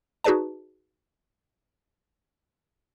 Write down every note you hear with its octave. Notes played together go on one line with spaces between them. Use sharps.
D#4 F#4 G#4 B4 D5 A5